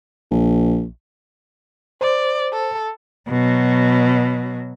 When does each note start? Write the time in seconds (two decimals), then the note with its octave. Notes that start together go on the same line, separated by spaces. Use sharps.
0.31 A#1
2.01 C5 D5
2.52 A4
3.29 B2 F#3